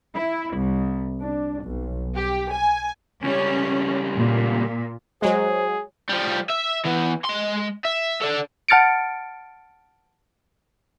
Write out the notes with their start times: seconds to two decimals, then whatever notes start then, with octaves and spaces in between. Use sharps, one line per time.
0.15 E4
0.54 C2
1.20 D4
1.63 B1
2.15 G4
2.52 G#5
3.24 C#2 G3 C#4
4.16 A#2
5.22 F#3 G#3 G#4 C5
6.09 F3 G3
6.49 E5
6.85 E3 B3
7.25 G#3 C6
7.85 E5
8.21 A4 D5
8.68 F#5 A5 F6 A6 C#7 D7